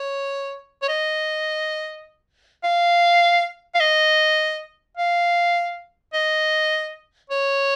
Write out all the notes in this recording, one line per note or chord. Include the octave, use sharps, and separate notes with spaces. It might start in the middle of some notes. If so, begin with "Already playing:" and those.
Already playing: C#5
C#5
D#5
F5
F5
D#5
F5
D#5
C#5